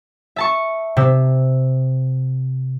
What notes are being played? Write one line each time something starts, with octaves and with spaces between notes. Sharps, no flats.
E5 A5 C#6
C3 E6